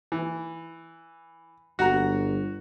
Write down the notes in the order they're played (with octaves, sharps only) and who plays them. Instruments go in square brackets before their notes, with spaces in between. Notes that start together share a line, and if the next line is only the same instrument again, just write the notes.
[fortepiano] E3
[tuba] G1 [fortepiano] F#4 F#5 A#5